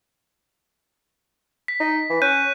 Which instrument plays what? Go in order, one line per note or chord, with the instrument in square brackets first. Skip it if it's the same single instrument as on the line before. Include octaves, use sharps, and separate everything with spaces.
[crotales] B6
[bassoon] D#4
E3
[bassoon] C#4 [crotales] F#6 G6 D#7